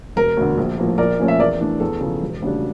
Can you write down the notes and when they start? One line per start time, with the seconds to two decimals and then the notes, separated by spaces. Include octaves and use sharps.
0.16 E1 A#4
0.37 D2 D3
0.57 A#1
0.77 A2 F3 A#3
0.98 A#1 A#4 D5
1.19 A#2 F3 A3 C#4
1.28 E5
1.39 E2 A#4 D5
1.60 E3 A3 D4
1.80 E2 A4
2.01 C#3 F3 C#4
2.22 E1
2.42 D2 C#3 G3 D4